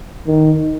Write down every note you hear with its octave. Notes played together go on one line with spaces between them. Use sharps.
D#3